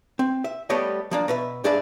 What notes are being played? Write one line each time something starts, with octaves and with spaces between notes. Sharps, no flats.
C4
E5
G3 A3 B3 G4 C#5 D#5
F3 A#3 D4
B2 B4 E5
G2 D4 G#4 D5 E5 B5